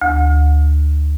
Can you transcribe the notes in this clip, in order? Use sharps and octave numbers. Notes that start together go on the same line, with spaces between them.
D2